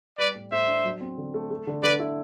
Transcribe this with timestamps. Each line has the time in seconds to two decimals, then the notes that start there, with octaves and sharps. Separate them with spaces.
0.18 G3 B4 D5
0.35 A2
0.52 A2 C5 E5
0.68 D4
0.85 F#3
1.01 C4
1.18 D3
1.34 A3
1.51 A3
1.67 D3
1.83 D3 B4 D5
2.00 E4